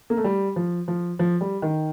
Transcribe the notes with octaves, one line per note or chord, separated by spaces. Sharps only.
A#3
A3
G3
F3
F3
F3
G3
D#3